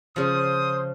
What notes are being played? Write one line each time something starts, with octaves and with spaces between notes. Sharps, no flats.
C#3 F3 C5 D#6